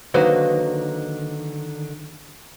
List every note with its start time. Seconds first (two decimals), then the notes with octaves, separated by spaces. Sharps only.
0.14 D3 D#3 F#3 A#3 D#4 B4 C5